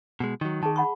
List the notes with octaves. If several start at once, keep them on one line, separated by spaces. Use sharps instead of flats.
B2 G#3
D#3 F#3
D#3 G#4 A5
F#5 B5 C#6